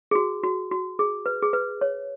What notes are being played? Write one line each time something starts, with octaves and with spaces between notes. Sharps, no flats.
G#4
F#4
F#4
F#4
G#4
B4
G#4
B4
C#5